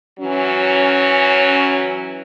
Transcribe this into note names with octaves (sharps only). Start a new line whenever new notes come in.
E3 F#3 C#4